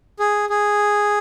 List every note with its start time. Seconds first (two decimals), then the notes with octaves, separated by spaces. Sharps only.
0.19 G#4
0.49 G#4